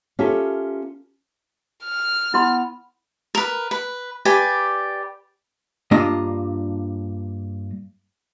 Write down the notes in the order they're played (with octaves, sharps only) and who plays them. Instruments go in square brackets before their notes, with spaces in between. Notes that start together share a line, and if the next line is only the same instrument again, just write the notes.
[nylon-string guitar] C#4 F4 G4 A4 A#4 E5
[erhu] F6
[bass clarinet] B3 [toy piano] E4 C6
[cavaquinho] A#4 B4
B4
G4 B4 D5 G#5
[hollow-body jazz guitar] G2 A#3 D4 F4 D#5